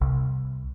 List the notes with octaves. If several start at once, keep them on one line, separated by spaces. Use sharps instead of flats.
C2